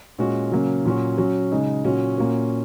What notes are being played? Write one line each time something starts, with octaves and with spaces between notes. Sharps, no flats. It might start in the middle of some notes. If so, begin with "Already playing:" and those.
A#2 G#3 C#4 F#4
C#3 F#3 A#3 C#4
A#2 F#3 C#4 F#4
F#3 C#4 F#4
C#3 G#3 D#4
A#2 F#3 C#4 F#4
A#2 A#3 C#4 F#4